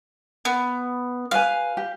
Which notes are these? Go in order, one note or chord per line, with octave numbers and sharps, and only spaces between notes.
B3
G4 B4 F5 G#5
G4